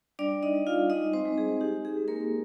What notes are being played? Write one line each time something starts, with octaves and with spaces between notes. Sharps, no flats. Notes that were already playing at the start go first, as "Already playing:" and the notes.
G3 D4 D5
D#4 D#5
G3
F4 F5
G#3 D#4 D#5
C4 C5
G#3
G#4
D#4 G4
G#4
G#3
A#3 A#4